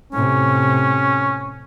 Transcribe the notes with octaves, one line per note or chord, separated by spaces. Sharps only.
A2 C3 C#4